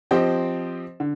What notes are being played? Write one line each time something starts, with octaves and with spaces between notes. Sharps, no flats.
F3 C4 G4 C5 D#5
D3